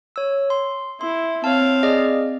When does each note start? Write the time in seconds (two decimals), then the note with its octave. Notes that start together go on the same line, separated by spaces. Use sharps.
0.16 C#5 E6
0.50 C6
1.01 E4 C6
1.44 C4 C#5 F5 A5
1.83 G#4 D5 D#5